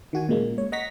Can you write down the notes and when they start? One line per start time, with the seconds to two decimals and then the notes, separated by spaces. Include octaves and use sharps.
0.13 D#3 F#4 G#5
0.29 A#2 C#3 G#3 A#3
0.58 C#5
0.72 D#5 F#5 A#5 C#6 A#6 B6